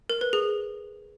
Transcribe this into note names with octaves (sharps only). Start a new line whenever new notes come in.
A#4
B4
G#4